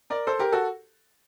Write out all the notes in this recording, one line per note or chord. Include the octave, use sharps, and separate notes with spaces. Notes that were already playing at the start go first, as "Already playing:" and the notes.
A#4 D5
A4 C5
G4 A#4
F#4 A4